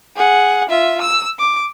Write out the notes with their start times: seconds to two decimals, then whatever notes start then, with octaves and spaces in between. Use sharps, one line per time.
0.16 G#4 F#5
0.69 F4 E5
1.01 E6
1.39 D6